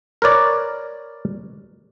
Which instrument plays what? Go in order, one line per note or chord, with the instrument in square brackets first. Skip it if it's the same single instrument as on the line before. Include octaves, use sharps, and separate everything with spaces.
[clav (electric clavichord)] A#4 B4 C#5 D5